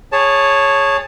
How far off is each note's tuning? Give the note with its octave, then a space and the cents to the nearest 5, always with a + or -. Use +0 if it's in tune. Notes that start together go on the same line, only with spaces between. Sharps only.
G#4 -15 C#5 +0 A5 +0